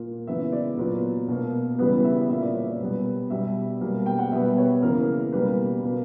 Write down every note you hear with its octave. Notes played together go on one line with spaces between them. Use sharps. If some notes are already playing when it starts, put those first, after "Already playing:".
Already playing: A#2 A#3
C#3 E3 B3 E5
D5
A#2 F#3 B3
B2 A#3
C#3 E3 G3 B3 B4
E5
A#2 A#3 E5
D5
C#5
D5
B2 G3 B3
B2 G3 B3 E5
B2 G3 A#3
G5
F#5
B2 G3 B3 E5
C#5
C#3 E3 A#3 A#4
B2 G3 A#3 B4
B2 A#3